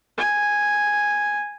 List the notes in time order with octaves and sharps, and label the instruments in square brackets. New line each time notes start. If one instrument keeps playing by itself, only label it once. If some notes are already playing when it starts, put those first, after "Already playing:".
[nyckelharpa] G#5